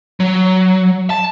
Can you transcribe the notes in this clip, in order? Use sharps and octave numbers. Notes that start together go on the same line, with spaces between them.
F#3
A5